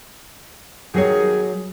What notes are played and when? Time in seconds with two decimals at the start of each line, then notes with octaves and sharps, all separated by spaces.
0.94 D#3 F#3 G4 G#4 C#5